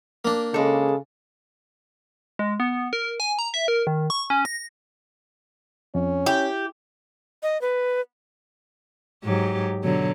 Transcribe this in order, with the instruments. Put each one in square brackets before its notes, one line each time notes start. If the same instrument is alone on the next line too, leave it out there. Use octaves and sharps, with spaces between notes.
[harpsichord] A#3 D4
[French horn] C#3 [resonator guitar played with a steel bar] G#3 A4
[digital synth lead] G#3
B3
A#4
G#5
A#5
E5
A#4
D#3
C#6
C#4
A#6
[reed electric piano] F2 [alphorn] C#4
[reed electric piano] E4 [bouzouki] G4
[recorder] D#5
B4
[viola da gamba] G#2 F#3 G4
B2 D3 F#3